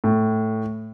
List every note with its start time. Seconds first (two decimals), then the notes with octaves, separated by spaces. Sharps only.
0.04 A2